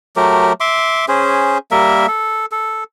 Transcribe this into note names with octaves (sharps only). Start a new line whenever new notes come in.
F#3 A3 G4 A#4
E5 C6 D6
C#4 G#4 C5
G3 A#3 A#4 E5
A4
A4